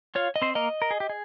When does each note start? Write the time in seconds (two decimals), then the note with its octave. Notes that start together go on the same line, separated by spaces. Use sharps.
0.15 F4 C#5 F5
0.36 D#5
0.42 C4 C5
0.55 A#3 A#4 D#5
0.82 A#4
0.91 G#4
1.00 G4
1.09 G#4